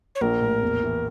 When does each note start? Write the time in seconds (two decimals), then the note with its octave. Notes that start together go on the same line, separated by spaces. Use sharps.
0.15 C#5
0.21 A#1 A#4
0.41 A2
0.62 E2
0.83 E3